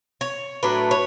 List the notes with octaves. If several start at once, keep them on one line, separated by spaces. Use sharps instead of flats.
C#5
A2 F#3 A3 D4 B4
C#5